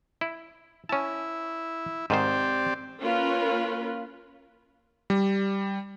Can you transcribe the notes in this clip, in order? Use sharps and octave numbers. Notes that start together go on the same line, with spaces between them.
E4
C#4 E4 A5
G#2 D#3 C4 G4 C5 D5
A#3 C#4 F4 A#4 B4
G3